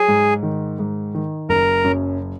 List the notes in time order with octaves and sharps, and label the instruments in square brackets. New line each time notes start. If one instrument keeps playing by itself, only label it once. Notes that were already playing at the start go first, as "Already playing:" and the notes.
Already playing: [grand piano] F#3 [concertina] G#4
[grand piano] G#2
D#3
G#2
D#3
[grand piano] F#1 [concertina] A#4
[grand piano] F#2